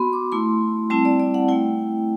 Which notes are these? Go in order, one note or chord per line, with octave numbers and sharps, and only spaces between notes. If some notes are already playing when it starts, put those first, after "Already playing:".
Already playing: B3 F#4 B5 C6
D6
A3 E4 C6
G3 C4 E4 A5
D5
D5
F#5
A3 E4 G5